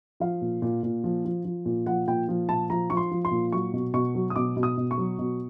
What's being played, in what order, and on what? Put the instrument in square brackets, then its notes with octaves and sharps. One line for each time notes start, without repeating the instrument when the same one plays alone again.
[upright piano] F3 F5
A#2
A#2
A#2
F3
F3
F3
A#2
F3 F#5
A#2 G5
F3
A#2 A5
F3 A#5
F3 C#6
C6
F3
C6
A#2
F#3 C#6
B2
B2 C#6
F#3
D#6
B2 D6
B2
D#6
B2
C#6
F#3
B2